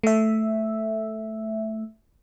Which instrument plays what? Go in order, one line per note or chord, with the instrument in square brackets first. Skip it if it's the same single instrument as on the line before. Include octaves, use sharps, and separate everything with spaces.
[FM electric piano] A3 E5